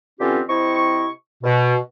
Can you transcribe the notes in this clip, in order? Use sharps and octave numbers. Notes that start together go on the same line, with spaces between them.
D3 E3 C4 C#4 F4 G4
C3 C4 E4 D#5 C#6
B2